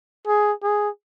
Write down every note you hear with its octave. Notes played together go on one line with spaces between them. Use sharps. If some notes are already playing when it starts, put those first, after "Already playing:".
G#4
G#4